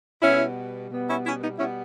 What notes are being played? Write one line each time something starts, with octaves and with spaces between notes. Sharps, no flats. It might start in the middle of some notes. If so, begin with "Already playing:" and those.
B2 G3 B3 C#4 E4
B2 G3 B3
C#4 E4
C#4 E4
B3 D#4
B2 G3 B3 C#4 E4